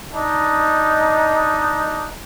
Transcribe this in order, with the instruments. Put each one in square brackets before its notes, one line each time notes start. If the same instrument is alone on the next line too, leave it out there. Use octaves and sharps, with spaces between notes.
[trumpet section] D4 D#4